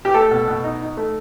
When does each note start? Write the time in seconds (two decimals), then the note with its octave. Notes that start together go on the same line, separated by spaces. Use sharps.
0.05 G4
0.14 A3 A4
0.31 B2
0.48 B2
0.64 D#4
0.80 D#4
0.97 A3